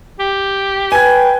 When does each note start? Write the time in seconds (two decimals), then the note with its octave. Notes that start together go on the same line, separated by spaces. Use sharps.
0.19 G4
0.92 B4 G5 G#5 G#6